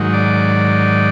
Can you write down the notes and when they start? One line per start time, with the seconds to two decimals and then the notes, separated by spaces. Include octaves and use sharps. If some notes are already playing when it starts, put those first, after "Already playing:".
Already playing: G#2 D#3 F#3
0.13 D5